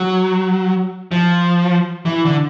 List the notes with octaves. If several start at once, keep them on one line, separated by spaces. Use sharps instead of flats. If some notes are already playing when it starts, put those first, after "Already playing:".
Already playing: F#3
F3
E3
D3